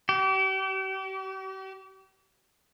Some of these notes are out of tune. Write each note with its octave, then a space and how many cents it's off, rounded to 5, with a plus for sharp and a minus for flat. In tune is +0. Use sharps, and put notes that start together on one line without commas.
G4 -40